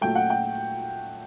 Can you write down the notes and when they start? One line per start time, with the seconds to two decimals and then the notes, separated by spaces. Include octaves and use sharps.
0.01 A#2 F#3 A3 G5
0.15 F#5
0.30 G5